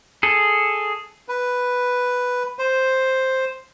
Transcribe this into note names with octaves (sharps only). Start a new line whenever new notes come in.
G#4 A4
B4
C5